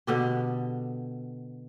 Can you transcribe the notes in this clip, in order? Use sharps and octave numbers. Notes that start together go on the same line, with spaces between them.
B2 D3 G4